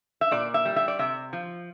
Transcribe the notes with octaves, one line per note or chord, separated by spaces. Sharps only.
E5
A#2 D5
E5
G3
E5
D5
C3 E5
F3